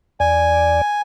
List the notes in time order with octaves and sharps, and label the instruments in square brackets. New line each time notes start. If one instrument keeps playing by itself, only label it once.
[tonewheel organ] E2 D5 [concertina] G#5